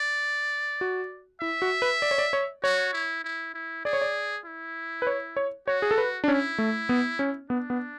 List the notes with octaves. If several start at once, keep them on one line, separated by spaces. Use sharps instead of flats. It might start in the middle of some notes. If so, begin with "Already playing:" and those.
Already playing: D5
F#4
E4 E5
F#4
B4
D5
C#5
D5
C#5
F#4 C#5
E4
E4
E4
G#4 D5
C#5
D5
E4
B4
C#5
C#5
F#4 C#5
G#4
A4
B4
D4
C#4 E4
A3
B3
C#4
B3 D4
B3